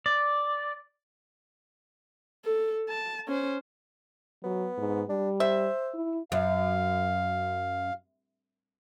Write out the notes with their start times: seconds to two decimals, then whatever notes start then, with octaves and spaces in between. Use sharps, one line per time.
0.06 D5
2.45 A4
2.89 A5
3.28 C#4 C5
4.44 F#3 B3
4.78 G#2
5.09 G3 D4
5.40 C5 E5
5.94 E4
6.32 F#2 F5